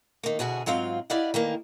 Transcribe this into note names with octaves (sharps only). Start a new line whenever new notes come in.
D#3 A#3
D2 B2 F#4 G#4
G#2 F#3 C4 F4 F5
E4 G4 D5 D#5 F5 F#5
D#3 E3 A#3